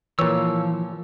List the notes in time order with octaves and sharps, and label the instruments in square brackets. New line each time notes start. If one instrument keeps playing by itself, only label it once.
[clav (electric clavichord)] A#2 C#5 [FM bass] E3 [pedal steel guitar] F3 E6